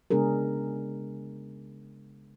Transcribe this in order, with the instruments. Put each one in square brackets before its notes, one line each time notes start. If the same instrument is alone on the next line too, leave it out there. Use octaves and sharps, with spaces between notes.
[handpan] C#3 G#3 B3 D4 G#4 A#4